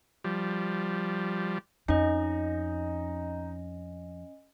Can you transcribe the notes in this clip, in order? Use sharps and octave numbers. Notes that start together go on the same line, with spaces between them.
F3 G3
F2 C#4 D#4 D#5